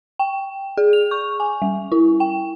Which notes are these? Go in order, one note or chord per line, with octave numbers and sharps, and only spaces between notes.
G5
G#4
F7
C#6
G#5
G3
E4
G5